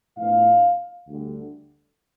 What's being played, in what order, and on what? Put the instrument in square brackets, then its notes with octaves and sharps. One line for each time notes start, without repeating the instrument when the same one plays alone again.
[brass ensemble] A2 F3 B3 D4 F5
D2 D3 G3